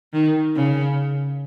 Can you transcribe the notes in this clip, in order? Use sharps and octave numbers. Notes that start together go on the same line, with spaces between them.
D#3
C#3